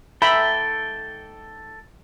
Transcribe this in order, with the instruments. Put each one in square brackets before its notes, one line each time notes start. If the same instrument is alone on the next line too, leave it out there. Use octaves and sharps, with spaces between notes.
[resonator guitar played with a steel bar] G#2 E5 A#5 [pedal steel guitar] A4 G5 [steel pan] B5